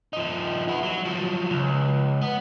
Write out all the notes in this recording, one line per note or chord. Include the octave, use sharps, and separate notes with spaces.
F3 D#4
B3 E4
F#3
F3 F#3
C#2
B3